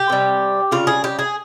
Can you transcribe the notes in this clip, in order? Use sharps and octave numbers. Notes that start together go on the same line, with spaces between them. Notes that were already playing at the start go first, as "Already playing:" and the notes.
Already playing: G4
C3 G3
C#3 G3 F4
G#4
G4
G#4